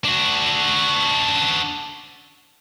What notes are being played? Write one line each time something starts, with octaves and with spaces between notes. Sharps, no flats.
D4 F#4